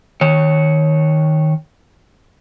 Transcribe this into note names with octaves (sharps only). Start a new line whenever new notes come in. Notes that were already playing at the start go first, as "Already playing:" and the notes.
D#3 C#5